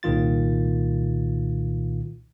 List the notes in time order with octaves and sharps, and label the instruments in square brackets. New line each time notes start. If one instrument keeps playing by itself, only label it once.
[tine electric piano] C2 A#2 D#3 F4 A6